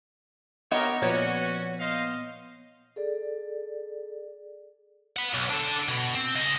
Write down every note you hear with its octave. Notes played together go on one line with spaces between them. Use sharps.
B3 G4 A#4 C#5 D#5
A#2 F3 B3 C#4 F#4 C#5 D5
C5 D#5 F5
G#4 A4 D5
F#5 B5
B1
D4 A4
B2
C4
C#3 D#5